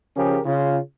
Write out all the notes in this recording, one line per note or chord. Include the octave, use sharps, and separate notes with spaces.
C#3 F3 C#4 G4 G#4 A#4
C#3 F4